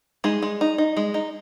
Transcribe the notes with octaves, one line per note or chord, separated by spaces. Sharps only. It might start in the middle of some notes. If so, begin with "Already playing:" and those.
G#3 D#4 G#4
G#3
D#4
D#4
G#3
D#4